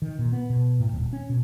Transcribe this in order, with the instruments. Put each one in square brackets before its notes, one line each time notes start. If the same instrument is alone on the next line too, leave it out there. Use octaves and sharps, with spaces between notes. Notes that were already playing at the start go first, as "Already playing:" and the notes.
[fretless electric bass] D#3
A#2
B3
B2
A2
D#1
C#4
B2